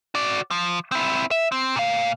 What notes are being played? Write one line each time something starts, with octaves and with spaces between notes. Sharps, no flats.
F#4 D5
F3
C4 E4
E5
C4
A#2 F5